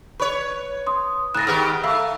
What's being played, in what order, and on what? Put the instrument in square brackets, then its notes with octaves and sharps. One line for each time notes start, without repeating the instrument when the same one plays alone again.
[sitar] B4 C#5 [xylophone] C#6
[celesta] C6 D#6
[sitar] G#2 [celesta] F#6 A#6 [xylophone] A6 E7
[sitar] D#3 B3 G4 [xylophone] G#4 D#6 F6
[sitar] A3 [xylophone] E5 F5 B5 [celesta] E6